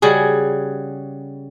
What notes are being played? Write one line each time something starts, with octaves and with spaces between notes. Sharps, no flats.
C#3 G3 F#4 G#4